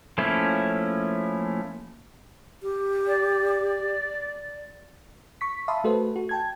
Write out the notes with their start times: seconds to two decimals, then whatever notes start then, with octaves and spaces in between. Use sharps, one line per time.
0.18 F3 A3 A#3 C#4 E4
2.63 G4
3.07 D5
5.41 C#6 B6
5.68 E5 F5 A5 B5 C6 D#6
5.84 A3 F#4 A4 B4 C5
6.16 F#4
6.29 G5 A5 G#6